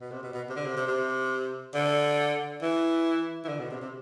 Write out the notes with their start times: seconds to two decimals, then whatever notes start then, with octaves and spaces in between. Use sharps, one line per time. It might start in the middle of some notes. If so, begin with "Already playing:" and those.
0.01 B2
0.11 C3
0.23 B2
0.34 B2
0.49 C3
0.56 D3
0.66 C3
0.77 C3
0.87 C3
1.74 D3
2.62 E3
3.44 E3
3.48 D3
3.59 B2
3.70 C3
3.81 C3